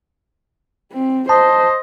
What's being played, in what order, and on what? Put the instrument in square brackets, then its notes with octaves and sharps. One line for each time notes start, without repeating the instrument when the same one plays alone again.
[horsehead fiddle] C4
[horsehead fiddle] C5 [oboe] D#5 [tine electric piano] A5